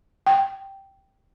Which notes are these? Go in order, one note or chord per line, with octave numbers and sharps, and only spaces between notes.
G5